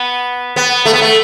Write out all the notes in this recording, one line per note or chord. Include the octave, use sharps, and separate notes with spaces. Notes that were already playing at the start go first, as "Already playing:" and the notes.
Already playing: B3
B3
A3
B3
A3